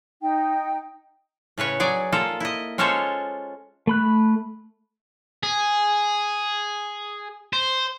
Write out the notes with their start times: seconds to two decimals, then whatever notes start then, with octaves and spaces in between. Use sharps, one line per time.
0.21 D#4 G5
1.58 A2 C#3 B4 C#5
1.80 F#3 G#4 D5
2.12 A#3 F4 A4
2.40 E4 D#5
2.78 G#3 C#4 F4 A4 C5 C#5
3.87 A3 B5 F#6
5.43 G#4
7.53 C5